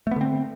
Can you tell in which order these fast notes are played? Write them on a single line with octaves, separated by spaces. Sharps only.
A3 B3 D3 C4